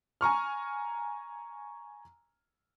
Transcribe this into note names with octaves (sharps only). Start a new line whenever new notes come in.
G#5 A#5 C#6 F6